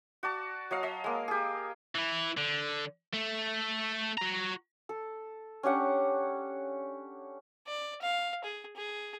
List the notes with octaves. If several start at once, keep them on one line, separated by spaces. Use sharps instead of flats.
F#4 D5 A5
F#3 D#5 F5
D#5
G#3 A#3
G4 G#4
E3 E4
D3
A3
F#4 A#5
A4
C#4 D4 G4 F#5
D5
F5
G#4
G#4